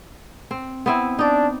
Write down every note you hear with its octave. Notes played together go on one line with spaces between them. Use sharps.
C4
B3 C4 E4
D4 D#4 D5